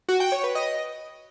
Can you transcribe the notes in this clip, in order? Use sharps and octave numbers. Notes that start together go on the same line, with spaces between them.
F#4
G5
C#5
B4
D#5